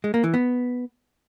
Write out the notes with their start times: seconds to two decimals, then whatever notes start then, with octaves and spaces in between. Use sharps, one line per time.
0.04 G#3
0.14 A#3
0.24 E3
0.34 B3